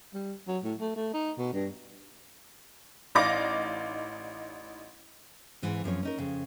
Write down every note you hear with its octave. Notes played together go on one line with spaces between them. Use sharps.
G3
F#3
A2
A3
A3
D#4
B2
G2
A1 D#4 D5 F5 D6 A#6
G#2 E3 C4
F#2 F3 C4 C#5
C#4 D#4 A#4
F2 C#3